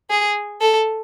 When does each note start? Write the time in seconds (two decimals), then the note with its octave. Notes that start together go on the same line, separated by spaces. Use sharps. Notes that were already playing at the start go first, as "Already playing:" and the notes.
0.10 G#4
0.61 A4